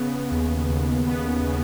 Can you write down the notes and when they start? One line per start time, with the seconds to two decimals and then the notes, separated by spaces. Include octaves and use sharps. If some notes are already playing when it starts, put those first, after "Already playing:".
Already playing: C#3 B3
0.31 D#2
0.70 D#2
1.08 B3
1.46 C#3